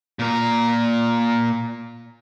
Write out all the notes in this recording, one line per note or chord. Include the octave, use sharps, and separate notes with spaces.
A#2 A#4